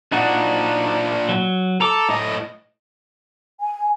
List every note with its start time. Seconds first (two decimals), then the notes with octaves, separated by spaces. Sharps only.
0.12 A#2 D4 D#4 F#4 F#5
1.29 F#3
1.81 A4 A#5 D6
2.09 A2 D#5
3.61 G#5